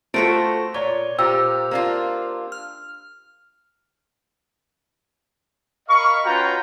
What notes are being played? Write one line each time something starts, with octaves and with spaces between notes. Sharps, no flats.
A3 F4 F#4 A4 C5 A#6 D7
A#2 C#5 D5
A#2 G4 C5 A#5 E6
A#3 D4 F4
F6
A#4 D#5 F5 B5 C#6
C#4 F4 F#4 B4 G5 A#5